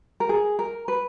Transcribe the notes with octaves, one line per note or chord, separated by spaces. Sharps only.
A#4
G#4
A#4
B4